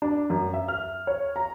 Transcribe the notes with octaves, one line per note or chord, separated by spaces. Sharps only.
D4
F#2
E5
F6
C#5
A#5